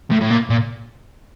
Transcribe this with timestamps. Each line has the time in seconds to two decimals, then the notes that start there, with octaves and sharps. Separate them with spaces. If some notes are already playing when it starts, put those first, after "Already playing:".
0.11 A2
0.21 A2
0.31 A#2
0.50 A#2